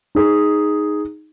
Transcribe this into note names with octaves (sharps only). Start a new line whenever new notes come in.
D#4 G#4